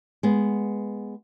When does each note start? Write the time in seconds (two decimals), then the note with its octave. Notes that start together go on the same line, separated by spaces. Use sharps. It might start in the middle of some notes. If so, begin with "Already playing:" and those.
0.23 G#3 B3